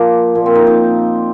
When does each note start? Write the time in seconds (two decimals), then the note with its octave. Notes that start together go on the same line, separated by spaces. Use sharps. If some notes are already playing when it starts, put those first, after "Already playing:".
Already playing: F3 A#3
0.35 A#2 F3
0.46 C4
0.55 D#4
0.67 D#4